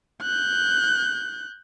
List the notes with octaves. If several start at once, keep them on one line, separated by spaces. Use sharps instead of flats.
F#6 G6